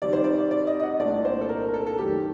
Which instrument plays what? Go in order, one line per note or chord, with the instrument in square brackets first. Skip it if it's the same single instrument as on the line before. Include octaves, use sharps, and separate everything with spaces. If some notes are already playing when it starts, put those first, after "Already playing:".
[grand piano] C3 D#3 G3 C4 D#4 [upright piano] D5
[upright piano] C5
D5
D5
D#5
D#5
F#5
[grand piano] C2 A#2 A3 D4 [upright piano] D5
[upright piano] C5
A4
A#4
A#4
A4
A4
[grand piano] F#2 D#3 A3 [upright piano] G4